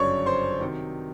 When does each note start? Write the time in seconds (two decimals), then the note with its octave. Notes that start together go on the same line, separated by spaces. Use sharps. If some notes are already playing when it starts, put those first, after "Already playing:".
Already playing: G1 F#2 C#3 F#3 C#5 D5 C#6
0.26 C5 C6
0.60 C3 D#3 F#3